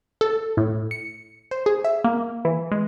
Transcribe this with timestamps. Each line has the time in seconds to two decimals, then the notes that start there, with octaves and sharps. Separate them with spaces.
0.21 A4
0.57 A2
0.91 C#7
1.51 C5
1.66 G#4
1.84 E5
2.04 A#3
2.45 E3
2.72 G#3